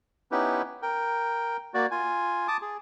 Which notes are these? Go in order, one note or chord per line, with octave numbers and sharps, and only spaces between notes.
B3 C#4 D#4 E4 G4 B4
A#4 G5
A#3 F#4 D5
F4 G#5
A5 D6 D#6
G#4